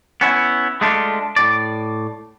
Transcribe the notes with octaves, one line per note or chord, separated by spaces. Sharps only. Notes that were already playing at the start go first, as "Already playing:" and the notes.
B3 C#4 E4
G#3 A3 D4 F4
A2 D5